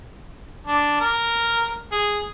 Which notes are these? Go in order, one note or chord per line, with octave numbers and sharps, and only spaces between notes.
D4
A#4
G#4